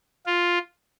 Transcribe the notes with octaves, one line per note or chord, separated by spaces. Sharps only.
F4